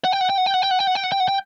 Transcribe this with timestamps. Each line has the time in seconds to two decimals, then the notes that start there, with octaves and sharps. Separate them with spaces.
0.04 F#5
0.13 G5
0.21 F#5
0.30 G5
0.38 F#5
0.46 G5
0.54 F#5
0.62 G5
0.71 F#5
0.79 G5
0.87 F#5
0.95 G5
1.04 F#5
1.12 G5
1.20 F#5
1.28 G5